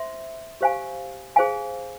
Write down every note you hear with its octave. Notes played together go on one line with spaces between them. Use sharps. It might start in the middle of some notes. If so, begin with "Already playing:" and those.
Already playing: C5 E5 C6
G4 C5 F5 G#5
G#4 C5 F5 G#5